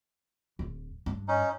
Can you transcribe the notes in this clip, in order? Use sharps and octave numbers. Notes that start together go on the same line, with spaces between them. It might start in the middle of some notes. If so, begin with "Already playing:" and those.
D1
G2
C#4 D#4